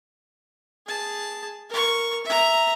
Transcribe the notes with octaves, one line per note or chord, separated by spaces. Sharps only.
G#4 A5
A#4 C#6
E5 A#5